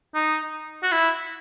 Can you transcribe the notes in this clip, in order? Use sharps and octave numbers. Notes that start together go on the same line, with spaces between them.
D#4
F#4
E4